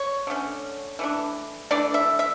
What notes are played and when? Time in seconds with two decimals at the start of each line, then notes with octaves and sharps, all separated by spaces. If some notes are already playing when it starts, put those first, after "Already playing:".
Already playing: C#5
0.27 D3 A3 C#4
0.99 E3 A3 D4
1.71 E3 A3 D4 D5
1.94 E5
2.19 E5